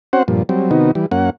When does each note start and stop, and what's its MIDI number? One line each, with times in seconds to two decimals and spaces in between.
0.13 0.23 60
0.13 0.23 61
0.13 0.23 66
0.13 0.23 72
0.13 0.23 78
0.28 0.43 43
0.28 0.43 46
0.28 0.43 53
0.49 0.71 54
0.49 0.71 55
0.49 0.71 60
0.71 0.91 48
0.71 0.91 51
0.71 0.91 59
0.71 0.91 63
0.71 0.91 66
0.95 1.06 52
0.95 1.06 55
1.11 1.30 42
1.11 1.30 58
1.11 1.30 61
1.11 1.30 78